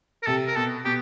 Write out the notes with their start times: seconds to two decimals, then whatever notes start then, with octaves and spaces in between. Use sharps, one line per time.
0.23 A#4
0.26 C3 A4
0.47 A#4
0.56 B2 A4
0.85 B2 G4